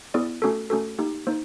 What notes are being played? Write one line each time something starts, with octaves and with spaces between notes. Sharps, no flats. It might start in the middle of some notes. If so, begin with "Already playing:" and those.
B3 E4 G#4 D5
A3 C#4 F#4 A4
A3 C#4 F#4 A4
A#3 D#4 G4
A#3 D#4 C5